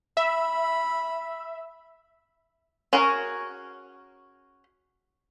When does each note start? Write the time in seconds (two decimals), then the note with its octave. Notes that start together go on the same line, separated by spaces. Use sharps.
0.17 E5 B5
2.93 C#4 F#4 G#4 A#4